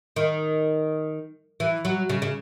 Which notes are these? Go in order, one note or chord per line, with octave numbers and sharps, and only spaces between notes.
D#3
E3
F#3
C#3
C#3